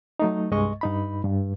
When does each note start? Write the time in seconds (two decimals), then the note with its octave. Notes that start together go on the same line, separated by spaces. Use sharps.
0.19 F#3 A3 D#4
0.51 C2 G2 G#3 D#5 C#6
0.81 G2 D#4 B5
1.24 G2